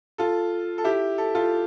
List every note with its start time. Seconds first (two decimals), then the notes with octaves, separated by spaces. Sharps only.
0.18 F4 A4
0.78 A4
0.84 E4 G4
1.18 A4
1.35 F4 A4